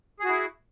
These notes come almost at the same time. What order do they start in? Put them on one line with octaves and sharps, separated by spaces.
G#4 F#4 E4